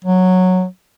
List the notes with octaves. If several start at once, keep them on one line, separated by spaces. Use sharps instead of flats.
F#3